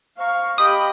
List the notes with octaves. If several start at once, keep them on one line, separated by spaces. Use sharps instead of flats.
C5 F5 A#5 C#6
G4 D#5 G5 B5 D#6